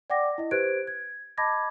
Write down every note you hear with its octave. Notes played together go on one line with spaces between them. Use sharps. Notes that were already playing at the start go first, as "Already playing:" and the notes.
D5 F#5 G5 D6 A#6
E4 D#5
G4 B4 C5 F#6 G#6 D7
G#6
D#5 A5 B5 D6 G#6 A#6